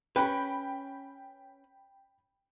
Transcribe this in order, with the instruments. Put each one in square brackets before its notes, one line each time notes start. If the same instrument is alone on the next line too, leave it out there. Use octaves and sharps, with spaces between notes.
[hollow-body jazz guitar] C#4 B4 [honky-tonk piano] G5 B5